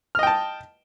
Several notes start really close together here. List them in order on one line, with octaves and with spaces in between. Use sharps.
F6 D#5 G5 A5